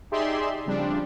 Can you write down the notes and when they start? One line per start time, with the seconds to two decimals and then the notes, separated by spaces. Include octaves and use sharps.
0.11 D#4 G4 G#4 D5 E5 C6
0.66 C#3 F3 G3 C4 D4